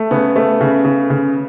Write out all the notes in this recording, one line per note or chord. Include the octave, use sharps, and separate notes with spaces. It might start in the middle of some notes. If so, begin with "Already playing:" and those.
Already playing: A3
C#3 B3
A3
C#3
C#3
C#3